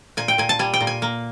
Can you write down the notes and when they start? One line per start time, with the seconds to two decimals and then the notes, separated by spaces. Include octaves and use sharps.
0.17 A#2 G#5
0.28 G5
0.38 A#2 G#5
0.49 A5
0.59 G3 G#5
0.74 G5
0.81 A#2
0.87 G#5
1.02 A#3